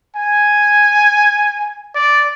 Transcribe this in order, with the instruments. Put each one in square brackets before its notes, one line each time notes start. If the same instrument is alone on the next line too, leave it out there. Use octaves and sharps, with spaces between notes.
[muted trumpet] G#5
D5